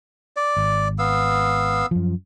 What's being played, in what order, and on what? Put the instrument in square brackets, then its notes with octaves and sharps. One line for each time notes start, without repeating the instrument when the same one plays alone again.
[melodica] D5
[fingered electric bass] G#1
[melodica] B3 F5 E6
[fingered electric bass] F#2 F3